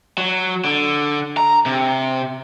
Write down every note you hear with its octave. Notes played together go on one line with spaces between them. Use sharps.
F#3
D3
A#5
C3